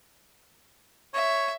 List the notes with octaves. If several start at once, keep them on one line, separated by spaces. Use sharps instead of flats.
C#5 E5